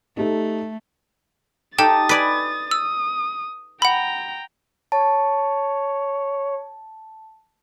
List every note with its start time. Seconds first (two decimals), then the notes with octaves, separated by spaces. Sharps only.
0.17 A3 D#4 G4 A4
1.78 D#4 G4 A4 G5 D#6 A6 E7
2.09 B4 D5 G#5 B6
2.71 D#6 E6
3.82 F#5 G5 A#5 B5
4.92 C#5 A5